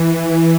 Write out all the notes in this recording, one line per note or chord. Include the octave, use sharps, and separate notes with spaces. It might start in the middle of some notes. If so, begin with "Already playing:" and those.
Already playing: E3